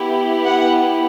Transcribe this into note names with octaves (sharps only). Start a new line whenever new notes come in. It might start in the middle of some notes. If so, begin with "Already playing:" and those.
Already playing: B3 E4 G4
F#5